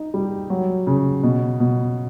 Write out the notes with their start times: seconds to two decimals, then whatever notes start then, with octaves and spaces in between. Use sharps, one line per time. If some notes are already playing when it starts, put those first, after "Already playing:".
Already playing: D#4
0.14 G3
0.50 F#3
0.87 C#3
1.23 B2
1.60 B2